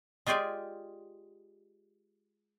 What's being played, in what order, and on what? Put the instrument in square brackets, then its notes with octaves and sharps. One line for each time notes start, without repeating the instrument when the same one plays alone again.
[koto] G#3 F4 G4 G#4 D5